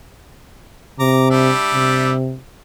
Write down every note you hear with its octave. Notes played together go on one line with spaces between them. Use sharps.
C3 A#5 D6
G3 D4 E5
C3